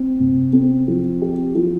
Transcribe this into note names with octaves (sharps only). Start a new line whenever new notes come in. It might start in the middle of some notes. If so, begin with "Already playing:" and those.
Already playing: C4
C3
C4
F3
G4
F3